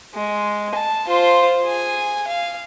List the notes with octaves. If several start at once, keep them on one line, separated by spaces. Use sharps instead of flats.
G#3
A5
F4 C5
G#4 G#5
F5